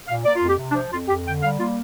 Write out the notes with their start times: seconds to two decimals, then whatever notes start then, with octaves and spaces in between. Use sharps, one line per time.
0.08 A#2 F5
0.25 A#3 D5
0.36 F4
0.42 F2
0.48 G4
0.59 C3
0.70 D4
0.75 F3
0.92 F2 F4
1.09 F2 G4
1.26 D3 G5
1.43 G3 F5
1.59 A#3 F4